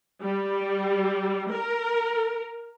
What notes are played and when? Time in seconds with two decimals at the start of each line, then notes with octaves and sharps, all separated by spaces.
0.23 G3
1.54 A#4